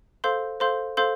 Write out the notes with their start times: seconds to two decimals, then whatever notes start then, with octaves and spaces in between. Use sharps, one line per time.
0.24 A4 C5 F5 C6 G6
0.60 A4 C5 F5 C6 G6
0.97 A4 C5 F5 C6 G6